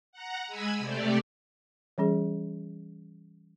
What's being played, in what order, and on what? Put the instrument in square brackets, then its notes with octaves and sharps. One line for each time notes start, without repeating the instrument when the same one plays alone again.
[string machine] F#5 A#5
G#3 G#5 B5 E6 G#6
C3 A3 G4 D5
[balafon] E3 G3 C#4 G#4